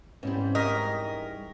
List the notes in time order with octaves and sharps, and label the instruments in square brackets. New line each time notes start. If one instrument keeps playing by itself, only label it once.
[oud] G#2 E3 G3 [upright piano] C4 C#4
[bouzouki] A#4 [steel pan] D#5 [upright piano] C#6 A#6 B6